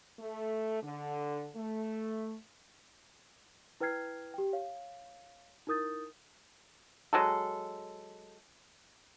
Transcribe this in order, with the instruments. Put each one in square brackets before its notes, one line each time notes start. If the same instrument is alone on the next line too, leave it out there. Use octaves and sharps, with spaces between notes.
[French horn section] A3
D3
A3
[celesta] E4 B4 G5 F6 G#6 C7
G4 G5
C#5 F5
D#4 E4 A#4 D#6 G6 A6
[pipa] F#3 G#3 A4